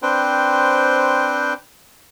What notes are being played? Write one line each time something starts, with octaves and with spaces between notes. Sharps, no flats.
C4 D4 B4 C5 G5